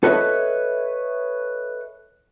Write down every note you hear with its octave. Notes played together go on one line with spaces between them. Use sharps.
A4 B4 C#5 D#5 E5